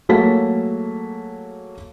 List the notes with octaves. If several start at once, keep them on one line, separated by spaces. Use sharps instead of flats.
F#3 A3 A#3 G#4 A5 B6